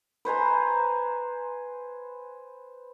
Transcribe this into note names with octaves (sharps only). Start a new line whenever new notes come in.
B4 C5 G#5 A#5